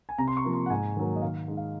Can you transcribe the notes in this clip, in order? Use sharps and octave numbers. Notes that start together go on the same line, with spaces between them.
G#5
C3 A#5
C6
C#6
F3 A#3
C6
F#5
G#2 G#5
D#3 F#3 A#3
D#5
D#3 F5
G#3 D#4
F5